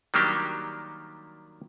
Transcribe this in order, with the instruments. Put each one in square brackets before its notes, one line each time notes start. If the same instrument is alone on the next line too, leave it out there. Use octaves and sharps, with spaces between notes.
[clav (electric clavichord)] D#3 F#3 G3 A#3 D4 G4